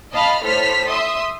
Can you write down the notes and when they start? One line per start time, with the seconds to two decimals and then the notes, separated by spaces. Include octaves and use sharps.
0.12 D#5 F5 A5 B5 F6
0.44 A2 A4 C5 F6 B6
0.87 E5 C6 D#6